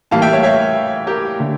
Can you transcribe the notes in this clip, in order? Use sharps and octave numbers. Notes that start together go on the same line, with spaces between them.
A2 E3 G3 A#3 F5 A5
E5 G5
C#5 E5
C#5 E5
G4 A#4
D3 A3